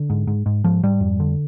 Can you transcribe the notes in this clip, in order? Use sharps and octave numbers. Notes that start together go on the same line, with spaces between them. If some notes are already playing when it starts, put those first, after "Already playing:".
Already playing: D3
G#2
G#2
G#2
G#2 F3
G#2 G3
F2
D3